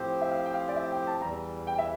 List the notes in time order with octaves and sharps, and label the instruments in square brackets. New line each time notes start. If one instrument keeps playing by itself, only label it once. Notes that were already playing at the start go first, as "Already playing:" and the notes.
Already playing: [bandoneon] A2 F3 C4 G4 C5
[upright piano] E5
F5
G5
F5
D5
E5
G5
A5
[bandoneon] E2 E3 G3 [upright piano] A#5
[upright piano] G5
E5